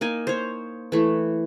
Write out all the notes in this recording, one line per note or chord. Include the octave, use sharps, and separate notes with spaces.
A#3 D#4 G#5
C5 C#5
E3 A3